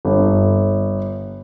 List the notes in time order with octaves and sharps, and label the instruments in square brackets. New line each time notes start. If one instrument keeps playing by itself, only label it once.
[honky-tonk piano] G1